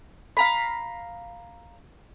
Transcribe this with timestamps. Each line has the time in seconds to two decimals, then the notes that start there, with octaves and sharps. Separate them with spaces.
0.37 F5 A#5 B5